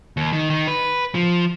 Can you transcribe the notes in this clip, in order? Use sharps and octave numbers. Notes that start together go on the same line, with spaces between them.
D#2
D#3
D#3
B4
F3